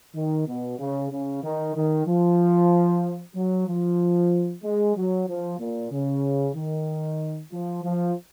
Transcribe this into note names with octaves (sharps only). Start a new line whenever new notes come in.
D#3
B2
C#3
C#3
D#3
D#3
F3
F#3
F3
G#3
F#3
F3
A#2
C#3
D#3
F3
F3